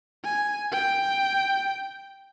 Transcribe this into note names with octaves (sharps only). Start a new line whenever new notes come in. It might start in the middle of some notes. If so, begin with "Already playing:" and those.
G#5
G5